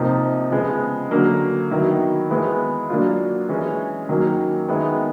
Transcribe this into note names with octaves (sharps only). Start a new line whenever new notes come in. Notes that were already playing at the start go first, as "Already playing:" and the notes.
Already playing: C3 F3 A#3 D#4
C#3 F3 G#3 B3
D3 F#3 A#3
D#3 F#3 B3 E4
E3 G#3 B3 E4
F#3 A#3 D4 F4
E3 G#3 C#4
D#3 F#3 A#3 C#4
D#3 G#3 B3 E4